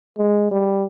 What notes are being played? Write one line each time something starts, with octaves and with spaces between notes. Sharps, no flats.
G#3
G3